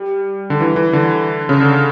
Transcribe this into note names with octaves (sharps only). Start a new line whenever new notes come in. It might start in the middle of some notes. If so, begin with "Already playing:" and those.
Already playing: G3
D3
E3
E3
D3
C#3
D3